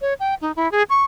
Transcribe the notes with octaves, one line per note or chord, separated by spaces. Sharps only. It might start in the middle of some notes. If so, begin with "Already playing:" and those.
C#5
G5
D#4
E4
G#4
C#6